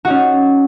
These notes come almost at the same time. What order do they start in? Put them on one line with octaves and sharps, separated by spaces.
F#4 D#4 C#4